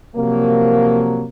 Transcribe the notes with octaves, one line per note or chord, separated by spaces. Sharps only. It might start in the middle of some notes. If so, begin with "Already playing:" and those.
C3 F3 F#3 A#3